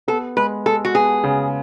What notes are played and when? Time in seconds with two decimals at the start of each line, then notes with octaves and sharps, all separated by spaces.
0.08 B3 A4
0.36 G#3 B4
0.66 G#3 A4
0.85 F#4
0.95 B3 G#4
1.24 C#3